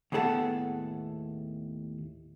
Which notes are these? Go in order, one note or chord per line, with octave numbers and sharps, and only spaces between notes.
D#2 A2 B3 G#4 A4 F#5